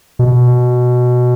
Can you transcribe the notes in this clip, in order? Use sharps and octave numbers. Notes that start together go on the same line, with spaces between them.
B2